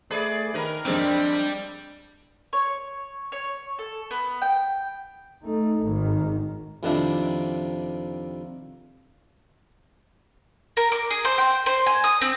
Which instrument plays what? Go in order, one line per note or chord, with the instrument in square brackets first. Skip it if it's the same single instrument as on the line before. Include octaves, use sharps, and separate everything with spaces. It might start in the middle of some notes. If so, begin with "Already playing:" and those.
[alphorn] A3 [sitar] G#4 B4 D5
[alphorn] D#3 [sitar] A#4 B4
[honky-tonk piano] F2 G#3 C4 [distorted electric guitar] G3 [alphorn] D4
[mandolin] C#5
C#5
A4
B3
G5
[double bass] A3 D#4
G#1 D#3
[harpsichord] F2 C3 D#3 F3 D4 E4
[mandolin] A#4
D6
G#4
C5
G5
C5
G#5
D#6
C4